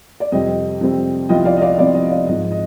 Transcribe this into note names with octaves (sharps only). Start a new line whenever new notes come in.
D5
F2 C3 G3 C4 D#5
F2 C3 G3 C4
C2 C3 F3 B3 F4 D#5 G5
D5 F5
D#5
D5 F5
C2 C3 F3 B3 F4 D5
D#5
D5 F5
G#1 G#2 F3 D#5
D#5